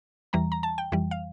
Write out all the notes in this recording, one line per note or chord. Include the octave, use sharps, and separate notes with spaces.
E2 E3 G3 A#5
A#5
A5
G5
F2 E3 G3
F5